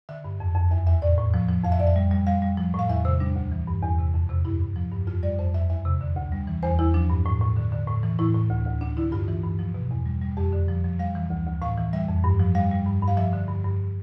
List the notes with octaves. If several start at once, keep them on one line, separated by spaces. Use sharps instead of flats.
D3 E5
G2
F2
F2
E2 E5
E2 E5
A2 D5
A2
F3
F3
F2 F5
E5
F2 D5
E5
G3
G3
G3 F5
G3
F3
A2 F5
E2 E5
C3 C5
G3 D4
D2
E3
G2
E2
C3
F2
C3
G2 E4
G2
F3
G2
F2 F4
G3 D5
F2 C5
F2 E5
E2 E5
C3
D3
D2
G3
E3
E2 C5
E2 E4
F3 D4
G2
A2
A2
D3
D3
A2
E3
A2 E4
A2
D2
D2
D2 D4
D3 E4
G2 F4
E3
G2
F3
B2
E2
G3
G3
F2 G4
D3
F3
F3
G3 F5
E3
D2
D2
A2 F5
E3
G3 E5
F2
G2
F3
G3 F5
G3
G2
G2
F5
F3 E5
D3
G2
G2